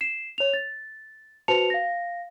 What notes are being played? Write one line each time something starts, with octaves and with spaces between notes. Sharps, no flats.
C7 E7
C#5 F7
A6
F#4 B4 C5 A5 C#7 F7
F5 A#6